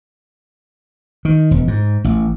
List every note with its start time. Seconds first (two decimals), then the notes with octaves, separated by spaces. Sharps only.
1.25 D#3
1.51 E1
1.68 G#2
2.04 A1